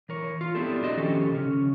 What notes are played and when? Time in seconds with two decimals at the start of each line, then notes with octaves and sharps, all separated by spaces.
0.09 E3 A#4 C#5
0.41 F4
0.55 B3 C4 D4 E4 G4 A4
0.83 D4 F#4 D#5
0.97 D#3 F3 C#4 G4 A4
1.31 C#3 C#4